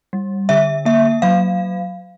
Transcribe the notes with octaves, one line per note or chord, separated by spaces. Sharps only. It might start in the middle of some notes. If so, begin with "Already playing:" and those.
G3
D3 E5
A#3 E5
F#3 F5